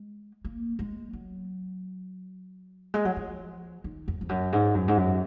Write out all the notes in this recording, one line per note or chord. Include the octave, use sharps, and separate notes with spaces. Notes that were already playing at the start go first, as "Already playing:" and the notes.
Already playing: G#3
A#3
G#3
F#3
G#3
F#3
F3
D#3
F2
F2
F#2
G#2
F#2
G#2
F#2